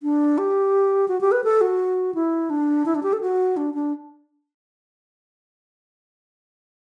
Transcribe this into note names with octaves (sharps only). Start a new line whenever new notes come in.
D4
G4
F#4
G4
B4
A4
F#4
E4
D4
E4
D4
G4
A4
F#4
D4
D4